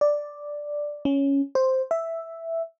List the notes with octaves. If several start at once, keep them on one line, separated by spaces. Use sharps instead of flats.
D5
C#4
C5
E5